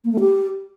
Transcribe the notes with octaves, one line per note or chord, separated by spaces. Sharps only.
A#3
A3
G4